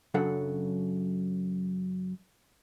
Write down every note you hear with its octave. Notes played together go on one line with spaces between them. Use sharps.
F#2 C#3 F#3 D4 A4 F#5